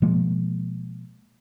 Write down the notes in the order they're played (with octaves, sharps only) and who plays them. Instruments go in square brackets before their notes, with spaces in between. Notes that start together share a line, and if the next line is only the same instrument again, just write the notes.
[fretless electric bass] B2 F3 G#3 A#3